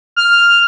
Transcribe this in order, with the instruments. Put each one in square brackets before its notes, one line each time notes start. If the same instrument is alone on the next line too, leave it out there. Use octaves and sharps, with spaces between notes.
[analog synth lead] F6